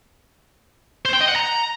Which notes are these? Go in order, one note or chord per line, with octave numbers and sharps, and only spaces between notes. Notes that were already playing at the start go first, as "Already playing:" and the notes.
C5
G5
D#5
F#5
A#5